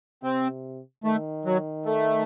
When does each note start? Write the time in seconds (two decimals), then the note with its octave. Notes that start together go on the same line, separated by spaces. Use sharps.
0.23 C3 C4
1.04 D#3 A3
1.45 F#3
1.86 A3